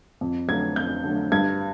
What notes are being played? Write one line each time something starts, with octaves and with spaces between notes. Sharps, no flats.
F2
D3 F#3 A3 G#6
F2 G6
D3 F#3 A3
G2 G#6